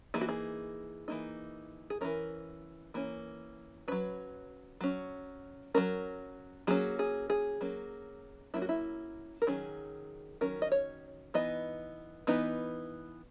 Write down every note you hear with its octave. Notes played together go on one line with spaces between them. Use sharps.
E3 A#3 D#4 G#4
F#4
G#4
E3 A#3 D#4
G#4
E3 A#3 C#4 A#4
E3 A#3 C#4
F#3 C#4 B4
F#3 C#4
F#3 A#3 C#4 A#4
F#3 A#3 C#4 G#4
G#4
G#4
F#3 A#3 C#4
F#3 A#3 C#4 E4
F#4
E4
A#4
D#3 F#3 C#4 G#4
D#3 F#3 C#4 A#4
D#5
C#5
E3 B3 D#4 D#5
E3 B3 D#4